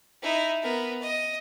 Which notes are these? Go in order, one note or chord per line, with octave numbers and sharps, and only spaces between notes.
D#4 E4
B3 A#4
D#5